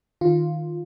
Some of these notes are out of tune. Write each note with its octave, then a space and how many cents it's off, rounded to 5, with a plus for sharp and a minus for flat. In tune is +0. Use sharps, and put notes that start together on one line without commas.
D#3 +0 F4 +0